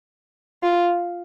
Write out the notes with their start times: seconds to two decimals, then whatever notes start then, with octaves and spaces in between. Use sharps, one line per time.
0.63 F4